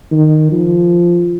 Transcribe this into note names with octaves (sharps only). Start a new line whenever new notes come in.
D#3
F3